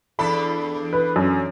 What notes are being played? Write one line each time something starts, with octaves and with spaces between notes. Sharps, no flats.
E2 D4 A4 B5
B4
F#2